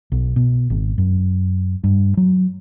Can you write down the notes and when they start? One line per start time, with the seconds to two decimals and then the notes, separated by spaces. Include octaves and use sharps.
0.12 B1
0.36 B2
0.70 G#1
0.98 F#2
1.84 G2
2.17 F#3